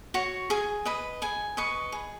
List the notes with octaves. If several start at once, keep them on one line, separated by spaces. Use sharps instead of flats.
F#4 C#5
G#4 G#5
B4 D#5 B5
G#4 G#5
B4 D#5 C#6
G#4